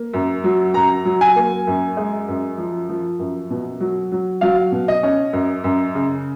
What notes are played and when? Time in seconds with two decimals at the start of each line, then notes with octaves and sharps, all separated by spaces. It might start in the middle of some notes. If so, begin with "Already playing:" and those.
Already playing: A#3
0.13 F#2
0.44 F#3
0.74 F#2 A#5
1.05 F#3
1.21 G#5
1.36 A#3
1.67 F#2
1.97 G#3
2.28 F#2
2.58 F3
2.89 F3
3.19 F#2
3.50 B2
3.80 F#3
4.12 F#3
4.41 F#3 F5
4.72 B2
4.88 D#5
5.03 C#4
5.33 F#2
5.64 F#2
5.95 C#3